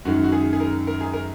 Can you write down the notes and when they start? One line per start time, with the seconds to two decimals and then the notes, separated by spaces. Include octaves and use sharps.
0.05 F#2 D#3 G#3 F#4
0.24 F#4
0.32 G#4
0.53 G#4
0.60 A#4
0.87 A#4
1.01 G#4
1.13 A#4